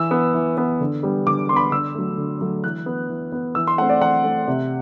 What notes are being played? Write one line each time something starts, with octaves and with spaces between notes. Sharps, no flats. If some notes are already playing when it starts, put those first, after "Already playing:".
Already playing: E3 E6
B3
E3
B3
D3
G3 B3
D3 D6
G3 B3 B5 C6
D3 E6
F#3 A3
D3
F#3 A3
E3 F#6
B3
E3
B3
E3 E6
C6
A3 C4 F#5
D5
E3 F#5
A3 C4
C3